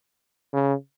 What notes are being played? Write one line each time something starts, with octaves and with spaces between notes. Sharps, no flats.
C#3